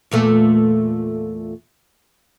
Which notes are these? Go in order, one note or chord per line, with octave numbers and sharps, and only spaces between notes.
E2 A#2 A3